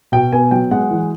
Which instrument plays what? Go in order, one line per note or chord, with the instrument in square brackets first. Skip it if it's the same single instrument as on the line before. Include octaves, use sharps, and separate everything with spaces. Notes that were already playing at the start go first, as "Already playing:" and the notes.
[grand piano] B2 G5
B3 G#5
F#3 G5
G#3 F#5
E3